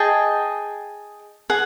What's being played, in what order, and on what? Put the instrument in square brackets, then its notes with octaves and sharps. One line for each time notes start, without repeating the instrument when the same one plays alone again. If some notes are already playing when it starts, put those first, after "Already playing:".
Already playing: [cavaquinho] G#4 D#5 G5 A5
G#4 F#5